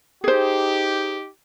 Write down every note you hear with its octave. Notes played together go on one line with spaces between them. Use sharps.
D#4 G4 G#4 C5